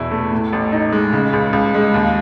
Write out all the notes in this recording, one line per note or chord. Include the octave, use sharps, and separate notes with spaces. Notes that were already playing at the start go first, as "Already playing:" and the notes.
Already playing: E2 B2 E3 E4
A3
A2
A1
D#4
G#3
C#3
C#2
C#2
G#3
D#2